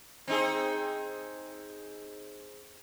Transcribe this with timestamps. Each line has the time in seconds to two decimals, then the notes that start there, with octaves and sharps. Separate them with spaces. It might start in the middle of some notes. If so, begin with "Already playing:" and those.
0.28 C4 D#4 G#4